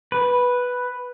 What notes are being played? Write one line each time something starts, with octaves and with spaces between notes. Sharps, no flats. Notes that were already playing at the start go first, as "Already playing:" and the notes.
B4